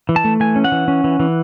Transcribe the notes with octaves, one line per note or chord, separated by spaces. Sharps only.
E3
A5
A3
E3 G#5
C#4
F#5
E3
C#4
E3
E3